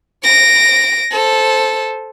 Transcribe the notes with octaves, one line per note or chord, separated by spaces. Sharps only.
A#6 D7
A4 C5